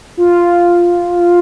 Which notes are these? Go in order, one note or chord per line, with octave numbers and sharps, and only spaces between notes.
F4